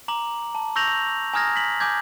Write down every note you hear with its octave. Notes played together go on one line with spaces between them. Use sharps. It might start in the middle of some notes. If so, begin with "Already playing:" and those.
A#5 D6 F#7
A5
C#6 E6 G6 A#6 F7 F#7
G#5 A#5 D#6 F6 G#6 A#6
B6 F#7
G#5 D6 G6 G#6